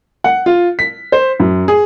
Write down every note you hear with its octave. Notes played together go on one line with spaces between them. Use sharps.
F#5
F4
B6
C5
F#2
G#4